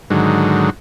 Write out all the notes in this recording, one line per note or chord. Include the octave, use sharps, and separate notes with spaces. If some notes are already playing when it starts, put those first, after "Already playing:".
G#2 D3 D#3 F#3